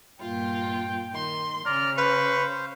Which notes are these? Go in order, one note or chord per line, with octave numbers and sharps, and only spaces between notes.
G2 A#2 F4 G5
D#3 C6
C#3 D5 A#5 F6
B4 C5 F5 C#6